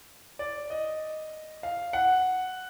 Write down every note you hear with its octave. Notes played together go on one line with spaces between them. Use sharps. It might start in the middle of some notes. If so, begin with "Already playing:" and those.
D5
D#5
F5
F#5